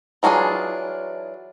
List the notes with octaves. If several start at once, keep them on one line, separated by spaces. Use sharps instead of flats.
E3 F#3 D4 F4 G#4